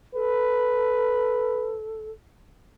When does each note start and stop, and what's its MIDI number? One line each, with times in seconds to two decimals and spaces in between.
0.15 2.11 69
0.15 1.78 71